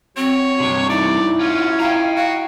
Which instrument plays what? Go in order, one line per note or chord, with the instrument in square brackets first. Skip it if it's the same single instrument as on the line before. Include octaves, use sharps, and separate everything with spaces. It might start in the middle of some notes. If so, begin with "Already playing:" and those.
[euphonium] F#3 [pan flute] C4 [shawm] C#5
[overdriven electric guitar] G2 C3 [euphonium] D4
[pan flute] D#4 [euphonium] E4 [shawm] D5
[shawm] C#4 [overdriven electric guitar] F4 F#4
[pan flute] F5 [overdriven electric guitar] G5 A#5
[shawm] F#4 [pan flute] F5